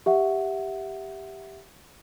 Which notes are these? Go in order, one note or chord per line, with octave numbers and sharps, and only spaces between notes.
G4 E5 F#5